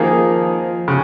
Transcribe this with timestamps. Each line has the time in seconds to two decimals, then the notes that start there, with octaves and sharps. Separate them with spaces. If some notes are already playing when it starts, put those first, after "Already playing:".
Already playing: D#3 F3 A#3 D#4 G#4
0.88 C#3